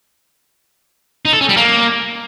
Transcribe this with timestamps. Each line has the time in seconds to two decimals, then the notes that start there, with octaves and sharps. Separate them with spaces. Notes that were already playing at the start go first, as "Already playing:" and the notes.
1.25 D#4
1.33 A4
1.41 C#4
1.49 G3
1.57 A#3